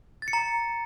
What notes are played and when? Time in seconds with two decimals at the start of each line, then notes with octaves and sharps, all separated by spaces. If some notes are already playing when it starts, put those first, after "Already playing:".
0.22 A6
0.28 C#7
0.33 A#5